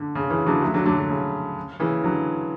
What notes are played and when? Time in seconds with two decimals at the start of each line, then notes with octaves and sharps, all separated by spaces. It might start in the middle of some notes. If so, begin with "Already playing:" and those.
Already playing: D3
0.15 C#3
0.30 C#3 E3
0.46 D3 F#3
0.62 F#3 A3
0.74 D3 F#3
0.86 D3 F#3
0.98 D3
1.09 C#3
1.79 C#3 E3
2.04 D3 F#3